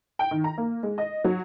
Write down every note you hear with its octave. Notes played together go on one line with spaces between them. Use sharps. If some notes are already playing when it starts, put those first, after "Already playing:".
G5
D#3
A#5
A#3
G#3
D#5
F#3